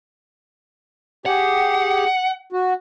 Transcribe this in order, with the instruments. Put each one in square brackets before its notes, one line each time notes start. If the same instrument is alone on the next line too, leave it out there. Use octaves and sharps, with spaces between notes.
[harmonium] G4 G#4 [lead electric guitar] F#5
[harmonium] F#4